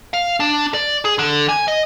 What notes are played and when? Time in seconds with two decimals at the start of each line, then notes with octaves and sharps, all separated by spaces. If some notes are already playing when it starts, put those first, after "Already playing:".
0.14 F5
0.40 D4
0.74 D5
1.05 G#4
1.19 D3
1.49 G#5
1.68 D#5